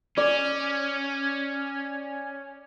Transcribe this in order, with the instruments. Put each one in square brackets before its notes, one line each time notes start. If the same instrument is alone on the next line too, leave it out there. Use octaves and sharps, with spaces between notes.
[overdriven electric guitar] C#4 [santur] D5